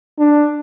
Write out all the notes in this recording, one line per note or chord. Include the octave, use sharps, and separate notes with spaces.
D4